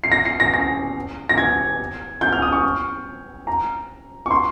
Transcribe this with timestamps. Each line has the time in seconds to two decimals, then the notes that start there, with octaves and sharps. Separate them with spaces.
0.04 C7
0.12 A#6
0.25 C7
0.40 A#6
0.54 A#6
1.29 A#6
1.38 G#6
2.21 G6
2.32 F6
2.42 D#6
2.52 C#6
3.47 A#5
4.26 C#6
4.31 C6